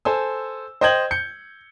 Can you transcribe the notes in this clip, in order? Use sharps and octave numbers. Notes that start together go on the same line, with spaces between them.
A4 C5 G#5 E6
C5 D#5 G5 G6 G#6 F#7
G6 C#7